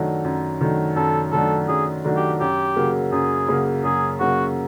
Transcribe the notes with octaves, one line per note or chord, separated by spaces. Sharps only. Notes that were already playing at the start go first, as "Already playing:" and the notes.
Already playing: F#2 D#3 F#3 A3 D4
F#2
D#3 F#3 A3 D4
F#2 A4
D#3 F#3 A3 D4 A4
F#2 G#4
D#3 F#3 A3 D4
G4
F#2 G4
C#3 F#3 A#3
F#2 G#4
C#3 F#3 A#3
F#2 G#4
C#3 F#3 A#3 F#4